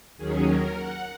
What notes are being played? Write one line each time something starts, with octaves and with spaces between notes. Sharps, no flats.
D#2 D#3 F#3 C#4 G#4
A#4
F#5